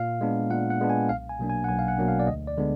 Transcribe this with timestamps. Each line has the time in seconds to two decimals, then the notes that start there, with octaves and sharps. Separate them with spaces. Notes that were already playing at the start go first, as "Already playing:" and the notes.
Already playing: A#2 F5
0.21 G#3 B3 D4
0.51 A#2 F#5
0.70 F#5
0.80 G#3 B3 D4
0.90 G#5
1.09 B1 F5
1.29 G#5
1.39 B2 F#3 A#3 D4
1.50 G#5
1.64 F#5
1.69 B1 G#5
1.79 F5
1.88 F#5
1.98 B2 F#3 A#3 D4
2.08 F5
2.19 D5
2.27 D2 D#5
2.47 D5
2.58 D3 G#3 B3 D4